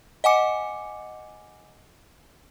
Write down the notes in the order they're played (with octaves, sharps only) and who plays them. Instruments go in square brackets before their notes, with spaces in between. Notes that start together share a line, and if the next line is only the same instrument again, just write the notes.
[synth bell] D#5 F#5 G#5 D6 C#7